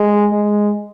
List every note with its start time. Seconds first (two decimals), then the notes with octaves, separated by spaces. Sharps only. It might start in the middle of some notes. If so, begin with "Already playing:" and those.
Already playing: G#3
0.32 G#3